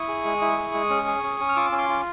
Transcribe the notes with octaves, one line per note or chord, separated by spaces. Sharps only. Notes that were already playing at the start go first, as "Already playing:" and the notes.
Already playing: E4 C#6 D#6
G#4
G#3
E4
G#4
G#3
C#4
G#4
C#4
C#4
F6
F4 D6 E6
C#4
C6 D6
F4